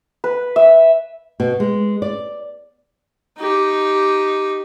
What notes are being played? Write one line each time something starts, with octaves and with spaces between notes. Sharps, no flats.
B4
E5
B2
G#3
D5
D#4 G4